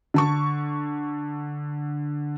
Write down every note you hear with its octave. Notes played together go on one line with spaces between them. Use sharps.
D3 A5 C#6